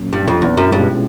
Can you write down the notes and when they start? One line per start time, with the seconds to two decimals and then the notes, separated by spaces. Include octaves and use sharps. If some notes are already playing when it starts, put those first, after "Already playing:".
Already playing: A#2 F#3 A#3 C#4
0.13 G2
0.28 F2
0.42 E2
0.57 F#2
0.72 G2 B2 G#3 C#4 F4